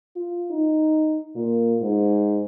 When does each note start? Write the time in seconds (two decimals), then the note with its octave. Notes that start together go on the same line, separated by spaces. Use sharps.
0.16 F4
0.51 D#4
1.35 A#2
1.81 G#2